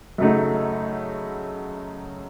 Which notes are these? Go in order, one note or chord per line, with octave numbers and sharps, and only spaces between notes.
F#2 C#3 F#3 A3 D#4